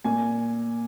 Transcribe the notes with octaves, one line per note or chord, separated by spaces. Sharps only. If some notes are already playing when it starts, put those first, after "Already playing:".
A#2 G#5